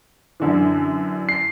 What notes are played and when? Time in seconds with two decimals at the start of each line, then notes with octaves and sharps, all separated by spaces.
0.40 F#2 D3 E3
1.29 C7